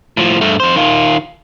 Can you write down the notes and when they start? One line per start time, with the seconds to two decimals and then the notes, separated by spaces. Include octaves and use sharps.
0.17 A2 F3
0.41 G2 A3
0.60 F2 C5
0.76 D#3 F4